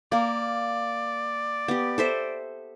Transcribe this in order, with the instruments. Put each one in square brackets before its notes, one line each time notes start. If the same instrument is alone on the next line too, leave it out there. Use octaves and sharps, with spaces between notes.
[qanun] A#3 A#4 [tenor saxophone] D5
[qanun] B3 G4
A4 C5 E5